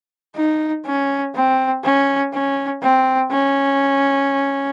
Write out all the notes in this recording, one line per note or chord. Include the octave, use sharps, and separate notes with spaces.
D#4
C#4
C4
C#4
C#4
C4
C#4